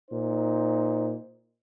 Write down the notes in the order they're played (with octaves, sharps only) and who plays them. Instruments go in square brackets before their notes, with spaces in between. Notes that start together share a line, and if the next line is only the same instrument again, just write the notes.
[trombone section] A#2 D#4 C5